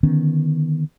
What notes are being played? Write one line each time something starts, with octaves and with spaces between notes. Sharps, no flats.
D3 D#3 B3 C#4